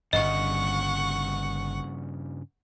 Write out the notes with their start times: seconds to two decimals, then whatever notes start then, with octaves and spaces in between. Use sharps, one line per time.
0.13 D1 G1 G2 C#3 D#5 F#5 C#6